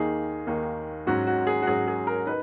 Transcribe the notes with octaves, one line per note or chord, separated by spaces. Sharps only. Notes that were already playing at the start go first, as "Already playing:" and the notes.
Already playing: D#2 D#3 A#3 D#4 G#4
D#2 D#3 A#3 D#4
G#2 F#3 C#4 F#4
F#4
G#4
F#4
G#2 F#3 C#4 G#4
G#4
A#4
D#4 B4